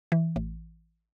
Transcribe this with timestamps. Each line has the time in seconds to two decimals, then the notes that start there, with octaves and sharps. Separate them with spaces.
0.12 E3
0.36 A1